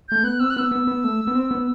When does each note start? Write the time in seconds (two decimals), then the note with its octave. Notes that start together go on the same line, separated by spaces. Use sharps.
0.09 A3 G6
0.24 B3 F#6
0.40 C4 E6
0.50 F#6
0.56 B3 E6
0.71 B3
0.87 B3
1.04 A3
1.27 B3
1.35 C4
1.51 B3